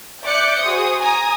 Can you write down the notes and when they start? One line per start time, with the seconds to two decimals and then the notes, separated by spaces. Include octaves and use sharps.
0.24 D5 E5 D6 F#6 G6 C#7
0.61 F#4 G#4 C5 D#6
0.99 G#5 A#5 D#6